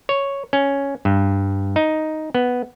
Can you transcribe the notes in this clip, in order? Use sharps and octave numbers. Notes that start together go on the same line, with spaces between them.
C#5
C#4
G2
D#4
B3